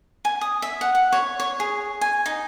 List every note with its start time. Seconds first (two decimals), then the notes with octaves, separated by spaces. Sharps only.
0.25 G#5
0.41 D#6
0.62 E5
0.81 F#5
0.95 F#5
1.12 C#5
1.40 C#5
1.60 G#4
2.01 G#5
2.26 D#4